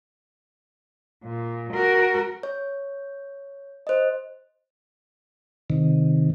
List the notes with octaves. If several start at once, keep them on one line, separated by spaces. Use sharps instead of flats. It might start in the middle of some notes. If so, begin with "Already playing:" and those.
A#2
F#4 A#4
C#5
C5 D#5
C3 D#3